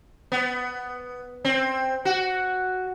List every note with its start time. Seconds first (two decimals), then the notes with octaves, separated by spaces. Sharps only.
0.32 B3
1.45 C4
2.05 F#4